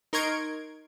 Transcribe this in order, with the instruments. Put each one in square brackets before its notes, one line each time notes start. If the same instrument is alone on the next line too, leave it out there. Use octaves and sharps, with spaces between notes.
[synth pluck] D#4 A#4 C6 C#6 G#6 D7